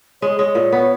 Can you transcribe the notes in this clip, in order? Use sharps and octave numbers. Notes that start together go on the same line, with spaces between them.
G#3 C#5
G#3 C#5
A#2
B3